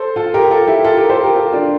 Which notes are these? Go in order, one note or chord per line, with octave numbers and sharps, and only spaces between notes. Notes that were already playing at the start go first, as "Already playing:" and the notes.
Already playing: A4 C5
F4 A4
G4 A#4
F4 A4
E4 G4
F4 A4
G4 A#4
A4 C5
G4 A#4
F4 A4
D4 F4